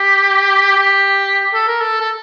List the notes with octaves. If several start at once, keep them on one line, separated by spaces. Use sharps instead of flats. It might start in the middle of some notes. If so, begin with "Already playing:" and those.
Already playing: G4
G4
A4
A#4
A4
A4